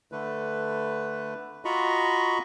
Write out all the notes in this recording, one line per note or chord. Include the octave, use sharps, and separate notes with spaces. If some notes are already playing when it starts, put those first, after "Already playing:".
D3 A3 B4
F4 F#4 D#5 A#5 B5 C#6